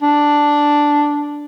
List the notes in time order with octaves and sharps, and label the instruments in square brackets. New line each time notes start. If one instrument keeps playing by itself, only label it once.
[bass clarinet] D4